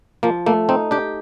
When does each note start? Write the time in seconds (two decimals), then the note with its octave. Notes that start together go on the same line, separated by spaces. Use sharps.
0.23 F3 A#3
0.46 A3 A#3
0.69 C4 D#4
0.91 D4 G4